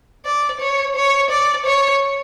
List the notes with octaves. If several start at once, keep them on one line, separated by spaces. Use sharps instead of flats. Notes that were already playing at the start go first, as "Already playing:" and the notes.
D5
C#5
C#5
D5
C#5